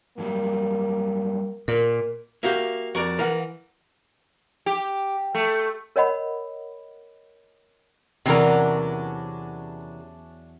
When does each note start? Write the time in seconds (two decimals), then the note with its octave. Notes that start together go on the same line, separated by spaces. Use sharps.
0.18 G2 F#3 G3 A#3
1.68 A#2 A#4
2.43 A#3 F#4 G4 E5 F5
2.95 F2 F#4 A#4 D5
3.19 E3 A#4 F5 F#5
4.66 G4
5.35 A3
5.96 A#4 C#5 D#5 F#5 B5
8.26 E2 C3 E3 F#3 B3 C#4 D4 A#4